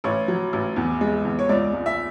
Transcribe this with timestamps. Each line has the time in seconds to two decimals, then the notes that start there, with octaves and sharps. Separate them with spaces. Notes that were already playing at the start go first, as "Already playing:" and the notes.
0.04 A1 C#5
0.28 F#3
0.53 A1
0.76 E2
1.01 G#3
1.25 E2
1.39 C#5
1.49 C#2 D5
1.74 C#2
1.86 E5